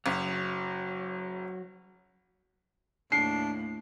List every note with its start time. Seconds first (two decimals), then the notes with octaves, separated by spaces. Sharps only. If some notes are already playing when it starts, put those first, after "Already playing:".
0.06 F#1 F#3
3.12 D#2 A2 D4 C7